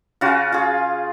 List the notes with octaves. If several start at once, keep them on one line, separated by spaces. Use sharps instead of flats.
C#3 C#4 F4 F#4
F4 G#4